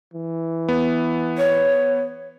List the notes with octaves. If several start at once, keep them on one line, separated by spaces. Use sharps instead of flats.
E3
B3
C#5